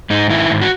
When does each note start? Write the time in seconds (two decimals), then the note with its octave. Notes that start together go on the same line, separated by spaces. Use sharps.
0.10 G#2 D#4
0.30 D#3 E4
0.51 G#2
0.62 F#4